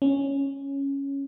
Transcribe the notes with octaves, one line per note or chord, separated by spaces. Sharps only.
C#4